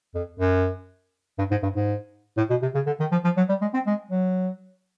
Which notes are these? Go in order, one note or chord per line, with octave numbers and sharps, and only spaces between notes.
F2
F#2
G2
G#2
G2
G#2
A2
B2
C3
C#3
D3
D#3
F3
F3
F#3
G3
G#3
C4
G#3
F#3